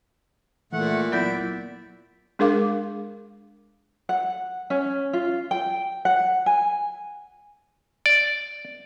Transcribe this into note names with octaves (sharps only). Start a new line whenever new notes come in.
A#2 E3 A3 F#5
F#3 A#3 B3 E4 F4 D5 E5 G6
G#3 D4 G#4 A#4 F5 D6
F#5
C#4
F4
G5
F#5
G#5
D5